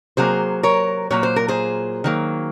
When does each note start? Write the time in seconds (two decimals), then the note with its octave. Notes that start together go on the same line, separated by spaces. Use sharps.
0.17 C3 F#3 A#3 G#4 C5
0.63 A#4 C#5
1.11 A#2 F#3 A#3 C#5
1.23 C5
1.36 A#4
1.48 G#4 C5
2.04 D#3 F#3 A#3